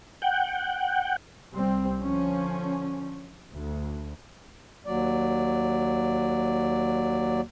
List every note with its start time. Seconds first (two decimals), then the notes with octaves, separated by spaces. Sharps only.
0.22 F#5 G5
1.53 C2 G3 C4
2.02 D3 F3 C#4
3.52 D2
4.86 D#2 F#3 D5